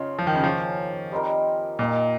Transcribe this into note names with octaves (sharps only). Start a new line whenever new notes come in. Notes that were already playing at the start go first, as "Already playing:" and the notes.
Already playing: C#3 C#4 D#4 F4 C5 D#5 F5
F3
D#3
C#3
F3 A#3 C#4 G#4
G3 C4 D#4 A#4
A#2 D#4 A#4 D#5